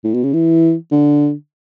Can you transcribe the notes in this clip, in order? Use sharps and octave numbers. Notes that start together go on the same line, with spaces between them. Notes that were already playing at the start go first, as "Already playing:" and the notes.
A2
B2
C#3
E3
D3